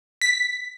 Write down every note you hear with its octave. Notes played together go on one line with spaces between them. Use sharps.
B6